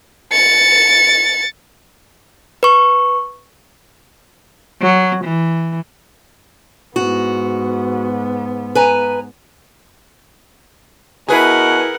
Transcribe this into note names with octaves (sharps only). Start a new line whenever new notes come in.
A6 C#7
B4 C#6
F#3
E3
G#2 B3 F#4
B4 G#5 A#5
B2 E4 G#4 A#4 B4 F#5 G#5